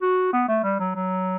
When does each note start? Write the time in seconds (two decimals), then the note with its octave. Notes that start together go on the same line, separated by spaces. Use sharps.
0.02 F#4
0.33 B3
0.48 A3
0.64 G3
0.80 F#3
0.95 F#3